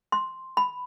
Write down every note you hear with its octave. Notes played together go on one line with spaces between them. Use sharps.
C6
B5